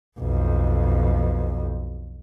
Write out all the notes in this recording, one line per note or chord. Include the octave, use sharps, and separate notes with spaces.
B1 F2